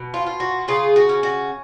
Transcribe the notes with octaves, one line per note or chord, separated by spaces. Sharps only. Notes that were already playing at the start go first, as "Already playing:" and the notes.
Already playing: B2
F4
F4
F#4
C#3 F4 G#4
F#4
C#4
F#4